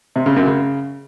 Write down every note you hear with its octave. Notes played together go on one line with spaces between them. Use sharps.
C3
C#3
F#2
C#3